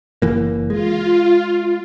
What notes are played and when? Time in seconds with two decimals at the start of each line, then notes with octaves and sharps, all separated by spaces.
0.22 F#1 E3 A#3
0.70 G#3 F4